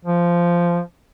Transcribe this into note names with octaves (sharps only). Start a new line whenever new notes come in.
F3